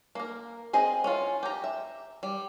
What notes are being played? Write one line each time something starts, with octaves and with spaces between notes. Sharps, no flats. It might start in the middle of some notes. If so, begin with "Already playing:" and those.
A#3 A#4
C4 G#4 D#5
C#4 E4 F4
G4 A#5
E5
G3